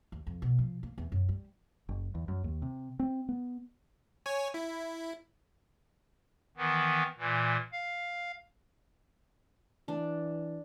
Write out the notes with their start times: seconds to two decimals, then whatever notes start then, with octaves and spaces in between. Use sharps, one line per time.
0.12 D#2
0.27 F2
0.42 B2
0.59 F3
0.83 A#3
0.98 E2
1.12 F#2
1.29 G3
1.89 F#1
2.15 E2
2.28 F#2
2.44 D#2
2.62 C3
2.99 C4
3.29 B3
4.26 C#5 G#5
4.54 E4
6.57 D#3 E3 B3
7.18 A#2 E3
7.73 F5
9.88 E3 D4